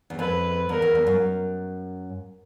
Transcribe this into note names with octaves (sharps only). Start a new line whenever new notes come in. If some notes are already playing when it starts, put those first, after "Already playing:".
E2
F2 B4
E2 A#4
E2
E2
F#2